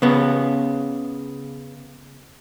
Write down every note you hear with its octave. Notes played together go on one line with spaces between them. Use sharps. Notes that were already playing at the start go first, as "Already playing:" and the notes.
C#3 B3